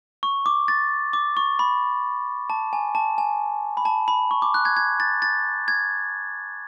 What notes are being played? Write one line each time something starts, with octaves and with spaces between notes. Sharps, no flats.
C#6
D6
A6
D6
C#6
B5
A5
G#5
A5
G#5
B5
A5
B5
C#6
D6
F#6
G#6
G#6
A6
A6
G#6